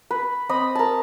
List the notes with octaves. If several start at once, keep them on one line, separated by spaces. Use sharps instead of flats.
B4
C4 D#5 B5 D#6
A#4 A5